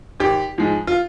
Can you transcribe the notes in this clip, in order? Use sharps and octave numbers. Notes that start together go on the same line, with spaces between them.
G#1 G4
G#2 F3 G#3
F4